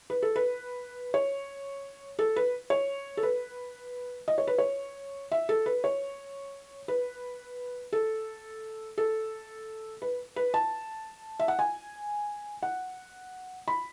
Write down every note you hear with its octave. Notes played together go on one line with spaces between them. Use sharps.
B4
A4
B4
C#5
A4
B4
C#5
A4
B4
D#5
C#5
B4
C#5
E5
A4
B4
C#5
B4
A4
A4
B4
B4
A5
E5
F#5
G#5
F#5
B5